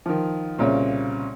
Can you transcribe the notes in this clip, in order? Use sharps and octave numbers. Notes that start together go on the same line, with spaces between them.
D#3 F3
C2 A#2 C#3 C#5